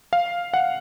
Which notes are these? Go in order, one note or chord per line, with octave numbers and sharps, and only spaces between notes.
F5
F#5